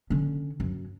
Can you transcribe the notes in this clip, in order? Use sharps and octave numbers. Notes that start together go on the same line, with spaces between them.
D3 C#4
F#2